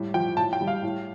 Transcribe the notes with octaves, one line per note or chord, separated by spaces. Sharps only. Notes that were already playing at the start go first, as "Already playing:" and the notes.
Already playing: A2 G3
F3 G5
A2 A5
G5
G3
F5
A2